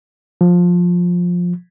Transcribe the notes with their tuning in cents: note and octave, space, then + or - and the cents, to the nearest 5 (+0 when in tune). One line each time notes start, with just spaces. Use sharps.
F3 +15